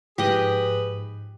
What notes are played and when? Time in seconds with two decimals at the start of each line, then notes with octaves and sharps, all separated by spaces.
0.18 G#2 F3 G4 G#4 B4 D#5